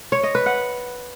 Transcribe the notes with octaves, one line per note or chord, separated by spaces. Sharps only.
C#5
D#5
B4
F#5